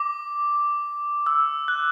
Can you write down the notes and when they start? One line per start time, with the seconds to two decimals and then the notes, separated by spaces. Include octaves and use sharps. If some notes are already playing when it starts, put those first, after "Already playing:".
Already playing: D6
1.27 E6
1.68 F#6